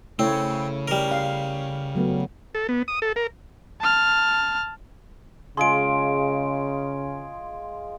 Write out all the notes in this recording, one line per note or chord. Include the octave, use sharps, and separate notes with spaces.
C#3 A3 C4 E4 C#5
G3 A#4
F5
F#3 A3 B3
A4
B3
D#6
A4
A#4
A5 F6
C#3 G#3 F4 G#4 C6 D7